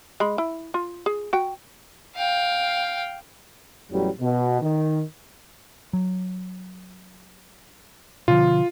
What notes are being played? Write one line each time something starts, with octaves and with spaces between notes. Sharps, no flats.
G#3 B5
E4
F4
G#4
F#4 G5
F5 G5
A1 E2 F#3 G3
B2
D#3
F#3
B2 D3 F3 F4